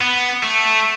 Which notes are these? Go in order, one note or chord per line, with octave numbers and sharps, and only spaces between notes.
B3
A3